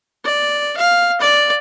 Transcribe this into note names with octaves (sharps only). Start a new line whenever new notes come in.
D5
F5
D5